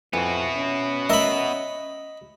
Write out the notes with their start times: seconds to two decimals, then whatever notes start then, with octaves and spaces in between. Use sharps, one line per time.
0.13 F2 E3 B3 F#4
0.57 C#4
1.10 A#4 D#5 E5 B5